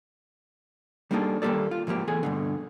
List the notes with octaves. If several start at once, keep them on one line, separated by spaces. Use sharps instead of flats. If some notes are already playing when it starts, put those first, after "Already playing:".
G3 A#3 D4 D#4 G#4 A4
D#2 G3 A#3 G4 A4 D5
F4
G#2 F3 A#3 G4
E2 G#4 A4 G#5
G2 B2 D3